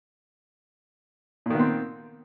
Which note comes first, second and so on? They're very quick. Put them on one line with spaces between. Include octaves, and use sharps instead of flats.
A#2 D#3 B3 C4